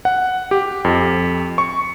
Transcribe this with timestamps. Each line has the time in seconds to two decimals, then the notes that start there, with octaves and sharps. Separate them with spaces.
0.05 F#5
0.51 G4
0.85 F2
1.58 C#6